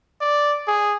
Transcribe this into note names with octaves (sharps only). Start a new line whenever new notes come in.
D5
G#4